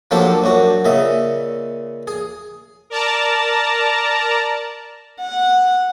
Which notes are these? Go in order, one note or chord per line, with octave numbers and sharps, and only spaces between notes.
F3 F#3 A#3 D4 G4 A4
F#2 D4 F#4
A#2 C#3 D#5 E5
G#4
A#4 D5 A5 A#5
F#5